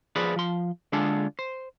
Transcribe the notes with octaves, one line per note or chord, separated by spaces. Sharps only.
F3 G#4 B4 C5 D5
F3 C6
D3 G#3 D4 F4 G#4 A4
C5